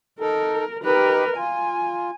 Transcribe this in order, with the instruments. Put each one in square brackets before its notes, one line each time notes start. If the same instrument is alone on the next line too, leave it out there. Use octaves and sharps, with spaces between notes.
[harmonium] D#4 A4 [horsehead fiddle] A#4
[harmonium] D#4 G4 [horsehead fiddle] A#4 B4
[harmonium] F4 [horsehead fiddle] G#5